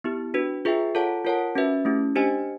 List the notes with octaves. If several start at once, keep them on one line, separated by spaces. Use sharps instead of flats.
B3 E4 G4
D4 F#4 B4
F4 G#4 B4 E5 G5
F4 A4 C#5 F#5 A5
F4 A#4 C#5 F#5 A5
C#4 F#4 B4 E5
A3 C#4 E4 G4
D4 G4 C5 D#5 G#5